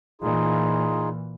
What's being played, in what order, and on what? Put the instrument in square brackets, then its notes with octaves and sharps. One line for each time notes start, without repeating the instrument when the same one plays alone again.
[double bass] A#2 E3 [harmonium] D#4 F4 G#4